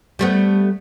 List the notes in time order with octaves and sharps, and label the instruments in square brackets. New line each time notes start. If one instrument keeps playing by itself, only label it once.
[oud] G3 A3 B3